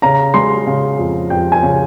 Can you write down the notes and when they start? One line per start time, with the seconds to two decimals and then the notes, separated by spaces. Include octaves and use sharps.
0.02 C#3 A#5
0.34 G#3 C6
0.67 C#3
0.99 F2
1.30 F2 G5
1.52 G#5
1.63 C#3